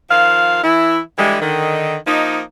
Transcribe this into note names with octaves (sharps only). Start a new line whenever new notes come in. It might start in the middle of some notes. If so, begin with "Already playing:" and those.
D#3 F3 F4 F5
E3 E4
D3 E3 G3 G#3
D3 D#3
F3 A#3 D#4